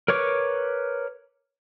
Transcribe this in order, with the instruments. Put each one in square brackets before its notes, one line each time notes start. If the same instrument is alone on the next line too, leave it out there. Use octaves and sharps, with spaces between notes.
[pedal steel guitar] A#4 B4 C#5 C#6 D6